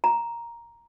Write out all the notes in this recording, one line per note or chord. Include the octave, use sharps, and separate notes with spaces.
A#5